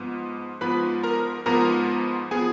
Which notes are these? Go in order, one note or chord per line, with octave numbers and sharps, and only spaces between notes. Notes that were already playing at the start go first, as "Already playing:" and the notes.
Already playing: G#2 F3 B3
G#2 F3 B3 B4 B5
A#4 A#5
G#2 F3 B3 A#4 A#5
F3 B3 G#4 G#5